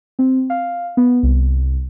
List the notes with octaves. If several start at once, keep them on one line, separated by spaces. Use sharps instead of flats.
C4
F5
B3
C2